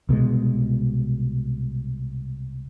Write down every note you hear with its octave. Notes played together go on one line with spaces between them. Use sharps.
C2 B2 D3 G#3